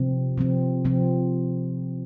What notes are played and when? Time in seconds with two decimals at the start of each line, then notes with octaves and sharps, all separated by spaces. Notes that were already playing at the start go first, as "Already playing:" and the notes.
Already playing: C3 F3 C4
0.38 C3 F3 C4
0.85 C3 F3 C4